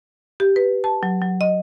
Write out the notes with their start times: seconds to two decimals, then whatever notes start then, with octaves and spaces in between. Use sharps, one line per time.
0.40 G4
0.56 B4
0.84 A5
1.03 F#3
1.21 F#3
1.41 D#5